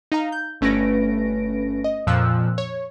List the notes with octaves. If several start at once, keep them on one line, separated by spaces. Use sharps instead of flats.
D#4 F5 A#5
G6
G1 A3 C#4 B4 A#6 D7
D#5
F2 A#2 F3 E6 F#6
C#5